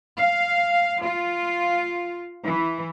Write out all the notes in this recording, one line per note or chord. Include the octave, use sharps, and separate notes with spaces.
F5
F4
E3